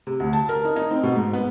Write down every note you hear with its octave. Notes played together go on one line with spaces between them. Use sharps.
C3
D2
A5
A#4
D#4
D#4
C4
B2
G#2
B3